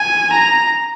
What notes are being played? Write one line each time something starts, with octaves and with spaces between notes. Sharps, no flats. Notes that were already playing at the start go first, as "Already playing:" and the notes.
Already playing: G#5
A#5